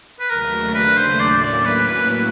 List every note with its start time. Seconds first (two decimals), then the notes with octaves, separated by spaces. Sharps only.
0.20 B4
0.30 D#2 C#3 F#3 A3 D4 A#4
0.74 B4
0.98 C5
1.19 A2 F#3 A#3 C#4 E4 D5
1.43 D5
1.66 B4
1.88 B4
2.10 B4